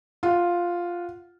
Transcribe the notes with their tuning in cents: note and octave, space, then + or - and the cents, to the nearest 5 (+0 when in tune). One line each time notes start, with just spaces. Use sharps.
F4 +0 F#5 -10